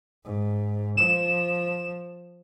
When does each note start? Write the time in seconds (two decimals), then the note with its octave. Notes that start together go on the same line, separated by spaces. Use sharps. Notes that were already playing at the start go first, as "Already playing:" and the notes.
0.25 G#2
0.97 F3 E7